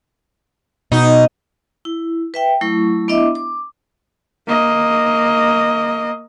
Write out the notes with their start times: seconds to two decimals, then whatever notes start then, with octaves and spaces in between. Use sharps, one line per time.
0.92 B2 D#4
1.85 E4
2.34 B4 E5 G5
2.61 F#3 A3 E4 C#6
3.08 B3 D4 E4 D#5 E5 D6
3.35 D6
4.48 A#3 D#5